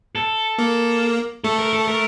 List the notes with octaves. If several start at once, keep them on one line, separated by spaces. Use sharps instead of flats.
A4
A#3
A3 A4
A#4
A4
A#4